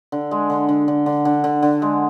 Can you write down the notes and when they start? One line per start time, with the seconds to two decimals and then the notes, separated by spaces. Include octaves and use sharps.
0.12 D3
0.31 G#3
0.50 D3
0.69 D3
0.88 D3
1.06 D3
1.25 D3
1.44 D3
1.62 D3
1.82 G#3